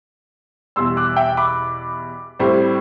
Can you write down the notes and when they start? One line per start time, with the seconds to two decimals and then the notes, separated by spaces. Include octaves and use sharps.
0.76 E2 B2 G3 C6 E6
0.97 D6 F#6
1.16 E5 G5
1.37 B5 D6
2.39 A2 G3 C4